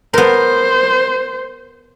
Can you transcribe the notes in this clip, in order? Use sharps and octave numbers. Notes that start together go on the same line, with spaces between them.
B3 A#4 C5